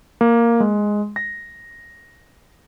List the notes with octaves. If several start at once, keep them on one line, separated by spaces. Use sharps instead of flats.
A#3
G#3
A#6